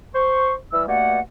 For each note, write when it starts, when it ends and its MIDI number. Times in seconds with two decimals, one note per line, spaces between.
0.15 0.55 72
0.15 0.55 85
0.73 0.87 52
0.73 0.87 55
0.73 0.87 88
0.88 1.20 43
0.88 1.20 47
0.88 1.20 57
0.88 1.20 58
0.88 1.20 74
0.88 1.20 78